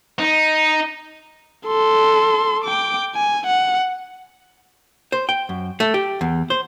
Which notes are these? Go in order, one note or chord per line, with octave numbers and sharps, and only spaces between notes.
D#4
A4 C6
G5 D6
G#5
F#5
C5
G5
F#2
A3
G4
E2
C5